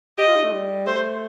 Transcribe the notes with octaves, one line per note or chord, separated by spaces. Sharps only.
G4 D#5
F4
D#4
A3
G3
A3 C5